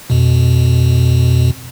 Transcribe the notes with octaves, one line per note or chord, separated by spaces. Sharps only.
F2 B2